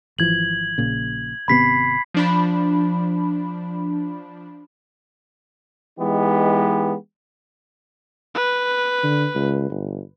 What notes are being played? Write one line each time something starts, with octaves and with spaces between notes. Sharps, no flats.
G#1 E3 F3 G#6 F#7
A#1 A#2 C#3
G#1 C3 B3 B5 B6 C7
F3 D4 B5
E3 G#3 B3 D#4 G4
B4
D3
C#2
G1